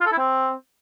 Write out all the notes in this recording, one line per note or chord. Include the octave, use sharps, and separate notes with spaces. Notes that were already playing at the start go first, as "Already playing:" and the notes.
F4
A4
E4
C4